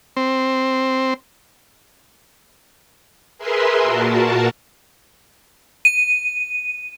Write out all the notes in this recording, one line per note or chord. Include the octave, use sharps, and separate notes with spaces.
C4
G#4 A#4 B4 E5 C6
A#2 F#4 A#4 A5
D#7